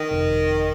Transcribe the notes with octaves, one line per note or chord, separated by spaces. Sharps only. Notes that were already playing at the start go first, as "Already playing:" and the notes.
Already playing: D#3
G1 F2 C3